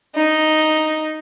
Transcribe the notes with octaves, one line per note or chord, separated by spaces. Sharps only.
D#4